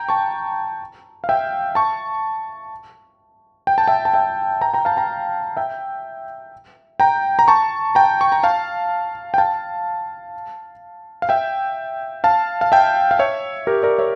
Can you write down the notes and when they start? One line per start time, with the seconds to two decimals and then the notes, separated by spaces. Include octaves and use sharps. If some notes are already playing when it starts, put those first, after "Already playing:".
Already playing: G5 A#5
0.09 A5 C#6
1.24 F5
1.29 E5 G5
1.75 A5 C#6
3.67 G5
3.78 A5
3.88 E5 G5
4.05 A5
4.14 E5 G5
4.61 G5 A#5
4.74 G5 A#5
4.85 F5 A5
4.97 G5 A#5
5.57 E5 G5
7.00 G5 A#5
7.39 A#5
7.48 A5 C#6
7.95 G5 A#5
8.21 C#6
8.32 A#5
8.43 F5 A5
9.34 G5
9.38 F5 A5
11.22 F5
11.29 E5 G5
12.24 F5 A5
12.61 F5
12.72 E5 G5
13.11 F5
13.19 C#5 E5
13.67 G4 A#4
13.83 A#4 D5
13.99 C#5 E5